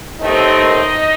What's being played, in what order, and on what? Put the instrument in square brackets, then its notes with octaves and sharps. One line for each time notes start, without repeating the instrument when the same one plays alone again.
[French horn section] D#2 D#3 A3 C4 D#4 D#5